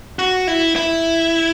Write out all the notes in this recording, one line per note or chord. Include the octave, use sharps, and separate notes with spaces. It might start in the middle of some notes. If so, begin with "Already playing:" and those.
F#4
E4
E4